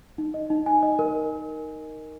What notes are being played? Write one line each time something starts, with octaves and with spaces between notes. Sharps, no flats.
D#4
D#5
D#4
G#5
D#5
A#4